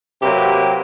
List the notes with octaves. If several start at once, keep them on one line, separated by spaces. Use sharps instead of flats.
C3 F#3 A#3 G4 B4 G5